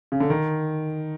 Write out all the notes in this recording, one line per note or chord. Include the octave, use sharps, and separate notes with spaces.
C#3
D3
D#3